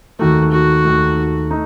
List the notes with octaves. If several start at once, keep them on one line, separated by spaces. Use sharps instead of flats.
D#2 D#3 A3 F#4
F#4
D#2 D#3 A3
A3 D#4